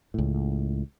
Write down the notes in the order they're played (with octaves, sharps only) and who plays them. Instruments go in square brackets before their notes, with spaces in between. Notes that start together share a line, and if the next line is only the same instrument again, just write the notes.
[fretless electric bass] C#2 A2